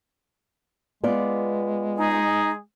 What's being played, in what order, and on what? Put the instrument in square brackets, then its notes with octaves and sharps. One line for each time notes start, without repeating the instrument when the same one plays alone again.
[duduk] G#3 [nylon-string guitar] B3 F4 D5
[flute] D#4 [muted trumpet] G#4